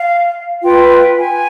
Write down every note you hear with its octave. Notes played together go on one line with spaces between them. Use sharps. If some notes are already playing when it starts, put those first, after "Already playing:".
Already playing: F5
F4 B4 G5
G#5